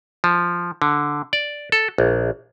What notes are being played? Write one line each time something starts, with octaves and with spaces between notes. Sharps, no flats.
F3
D3
D5
A4
A#1